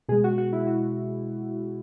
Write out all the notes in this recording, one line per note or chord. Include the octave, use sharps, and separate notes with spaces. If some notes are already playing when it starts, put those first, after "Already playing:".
B2 G#3 G#4
F#4
F#4
E4
F#4